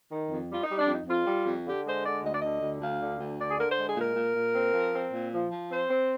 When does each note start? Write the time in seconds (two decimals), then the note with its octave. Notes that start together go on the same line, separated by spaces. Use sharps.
0.11 D#3
0.31 F2
0.50 G3 F4
0.63 D#4
0.69 G3
0.77 D4
0.88 F2 D#4
1.07 F2 F4
1.27 G3
1.46 F2
1.65 D3 G4
1.85 G#3 C5
2.04 D3 D5
2.23 D2 D#5
2.31 D5
2.39 D3 D#5
2.62 D2
2.81 D2 F5
3.00 D3
3.20 D2
3.39 D3 D5
3.50 G#4
3.58 D3 A#4
3.68 C5
3.77 G#3
3.85 G#4
3.96 A#2 A#4
4.16 A#2
4.35 A#2
4.54 C4
4.74 F3
4.93 C4
5.13 A#2
5.32 F3
5.50 F3
5.70 C4 C5
5.89 C4